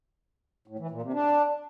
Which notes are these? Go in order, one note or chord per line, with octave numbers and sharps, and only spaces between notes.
A2
E3
A#2
C3
D4